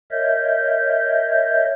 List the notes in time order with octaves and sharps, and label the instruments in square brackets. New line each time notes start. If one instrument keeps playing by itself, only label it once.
[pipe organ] A#4 C#5 D#5 E5 G6